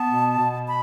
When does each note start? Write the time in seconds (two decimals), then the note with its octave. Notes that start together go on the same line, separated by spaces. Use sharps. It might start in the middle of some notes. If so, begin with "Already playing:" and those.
Already playing: B3 A5
0.10 B2
0.39 B2
0.68 B5